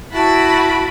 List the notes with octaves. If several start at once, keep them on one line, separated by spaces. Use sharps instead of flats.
E4 F#4 A5 B5 D7